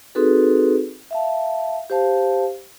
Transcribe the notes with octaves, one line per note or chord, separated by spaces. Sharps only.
C4 D#4 F#4 G#4 A4 B4
E5 F5 A5
G4 C5 F5 A5